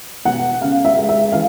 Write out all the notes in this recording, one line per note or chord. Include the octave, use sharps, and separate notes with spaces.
B2 F#5
C#3 F5
E5
G#3
E5
E3 F5